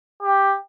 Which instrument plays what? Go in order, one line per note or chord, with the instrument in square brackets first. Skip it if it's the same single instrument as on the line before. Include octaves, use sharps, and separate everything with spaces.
[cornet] G4